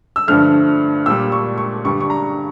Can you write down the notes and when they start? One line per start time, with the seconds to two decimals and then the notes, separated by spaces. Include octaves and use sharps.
0.16 E6
0.27 G2 D3 F3 A3 F6
1.06 A#2 G3 E6
1.32 C#6
1.58 C#6
1.85 G2 D3 G3 C#6
2.01 C#6
2.10 A#5